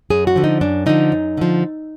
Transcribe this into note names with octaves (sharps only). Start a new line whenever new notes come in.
F#2 G#4
F#4
D3 F3
D#4
F#2 D4
D3 F3 D#4
F#2
D3 F3